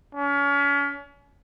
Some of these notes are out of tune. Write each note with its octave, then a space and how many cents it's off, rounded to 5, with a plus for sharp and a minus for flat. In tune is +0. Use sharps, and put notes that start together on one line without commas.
C#4 +35